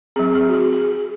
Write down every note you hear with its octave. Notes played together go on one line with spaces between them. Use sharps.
F#3 C4 G#4
G#4
F#4
G#4
G#4